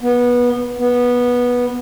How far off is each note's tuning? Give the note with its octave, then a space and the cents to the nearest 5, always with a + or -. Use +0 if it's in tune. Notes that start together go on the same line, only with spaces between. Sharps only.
B3 -20
B3 -15